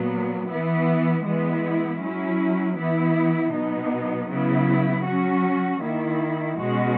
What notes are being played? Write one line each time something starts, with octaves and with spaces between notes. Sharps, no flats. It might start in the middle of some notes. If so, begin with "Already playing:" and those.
Already playing: A#2 F#3 B3
E3 B3 E4
E3 G#3 B3 E4
F#3 C#4 E4
E3 B3 E4
B2 F#3 B3 D#4
C#3 F#3 B3 E4
F#3 C#4 F#4
D#3 A#3 E4
B2 G#3 C#4 F#4